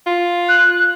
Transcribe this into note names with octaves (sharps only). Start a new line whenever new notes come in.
F4
F#6